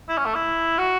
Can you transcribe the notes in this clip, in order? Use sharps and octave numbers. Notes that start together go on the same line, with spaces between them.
E4
C#4
A3
E4
F#4